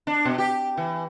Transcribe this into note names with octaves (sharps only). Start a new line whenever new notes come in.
D4
B2
G4
E3